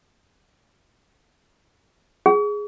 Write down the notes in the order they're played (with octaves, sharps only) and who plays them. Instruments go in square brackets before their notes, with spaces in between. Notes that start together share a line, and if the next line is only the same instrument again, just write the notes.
[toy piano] G#4